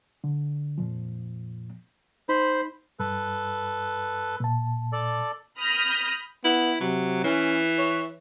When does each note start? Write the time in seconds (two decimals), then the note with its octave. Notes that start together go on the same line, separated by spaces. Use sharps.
0.24 D3
0.78 F2 A#2 F3
2.29 D#4 C5 B5
3.00 G2 A4 B4
4.40 A#2 A5
4.93 A4 D5
5.59 B5 D#6 F6 G6 A#6
6.44 B3 E4
6.81 C3 F#3
7.24 E3 C#4
7.78 C#5